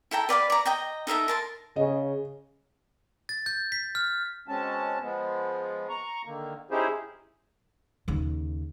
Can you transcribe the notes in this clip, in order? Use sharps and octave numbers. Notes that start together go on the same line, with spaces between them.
E4 A4 G5 A#5
B4 D5 F5 B5
D5 A#5
D#5 G5 A#5
D#4 A4 A#4 E5
A#4 A5 C6
C#3 D#5
A6
G6
B6
F6
B2 G#3 C4 C#4 A5
F3 G#3 B3
A#5 C#6
D3 D#3 A#3
C#4 D#4 E4 G4 G#4 C5
D#2 C#3